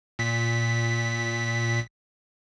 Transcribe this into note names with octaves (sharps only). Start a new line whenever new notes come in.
A#2 B6